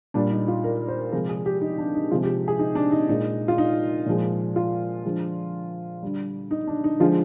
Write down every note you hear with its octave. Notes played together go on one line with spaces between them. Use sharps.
A#2 G3 D4
D#4
F4
A#4
C5
C3 F3 G#3 A#4
G#4
G4
D#4
D4
D#4
C3 F3 G#3 F4
G4
G#4
D#4
D4
D#4
A#2 G#3 D#4
F4
D#4
A#2 F3 G#3
F4
D3 F3 G#3
D3 G3
D#4
D4
D#4
D3 F3 G#3 F4